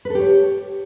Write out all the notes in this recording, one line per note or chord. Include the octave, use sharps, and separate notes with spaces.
G4 A4 B4 C#5